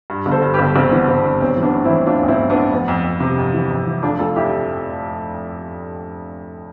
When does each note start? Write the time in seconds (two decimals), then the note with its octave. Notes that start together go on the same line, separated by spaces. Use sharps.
0.10 G2
0.26 G1
0.31 A4 C5
0.42 G2
0.54 G4 B4
0.59 G1
0.75 G1 C4
0.92 E3 B3
1.08 G1 C4
1.24 G2
1.41 B1 C4
1.57 E3
1.63 B3 D4
1.73 A2
1.84 C4 E4
1.90 E3
2.06 A2 D4 F4
2.23 B1
2.28 C4 E4
2.39 B1
2.50 B3 D4
2.55 A2
2.72 F2 B3
2.88 F2
3.04 F2
3.20 C3
3.38 F2
3.54 E3
3.70 F2
3.87 E3
4.02 F1 D4 F4
4.19 F1 F4 A4
4.36 F2 E4 G4